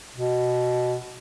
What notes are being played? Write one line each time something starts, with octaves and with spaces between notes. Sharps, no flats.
B2